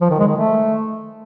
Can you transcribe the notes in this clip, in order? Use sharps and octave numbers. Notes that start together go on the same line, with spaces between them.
F3
D#3
G#3
D#3
A3